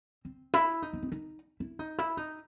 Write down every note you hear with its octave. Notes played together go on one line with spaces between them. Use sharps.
C4
E4
D#4
B3
C4
D#4
E4
D#4
E4
D#4